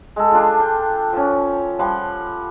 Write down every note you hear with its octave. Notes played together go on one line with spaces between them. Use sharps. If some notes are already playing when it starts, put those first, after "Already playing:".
G#3 A4
D4 F4
G5
F3 C#4
F3 G3 F#5 C6